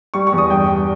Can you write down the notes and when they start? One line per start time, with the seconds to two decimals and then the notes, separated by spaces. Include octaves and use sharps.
0.14 G3 C#6
0.27 C#6
0.32 E2
0.38 D#6
0.50 G2 G5
0.70 G3